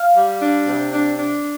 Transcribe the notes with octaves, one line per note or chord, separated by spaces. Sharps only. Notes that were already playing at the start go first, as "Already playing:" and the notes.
Already playing: F5
G3
D4
C3
D4
D4